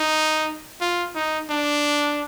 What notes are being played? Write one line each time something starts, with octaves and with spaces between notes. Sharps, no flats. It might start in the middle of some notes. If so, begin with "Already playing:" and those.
Already playing: D#4
F4
D#4
D4